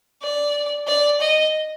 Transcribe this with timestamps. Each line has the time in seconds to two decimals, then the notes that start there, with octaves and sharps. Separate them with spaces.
0.22 D5
0.87 D5
1.21 D#5